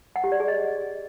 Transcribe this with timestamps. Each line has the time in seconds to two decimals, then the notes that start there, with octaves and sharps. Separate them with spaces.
0.16 F#5
0.24 G4
0.32 D5
0.40 G#4
0.48 D#5